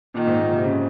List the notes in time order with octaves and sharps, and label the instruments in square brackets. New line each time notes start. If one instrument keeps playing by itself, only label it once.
[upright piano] A#2 [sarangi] D#3
[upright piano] G#2
A#2
C3
C#3